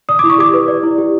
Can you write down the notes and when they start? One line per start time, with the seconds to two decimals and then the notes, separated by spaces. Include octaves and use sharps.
0.09 D5 D#6
0.19 E4 D6
0.30 C#6
0.38 G4 D6
0.54 B4
0.68 D5
0.83 E4
0.98 G4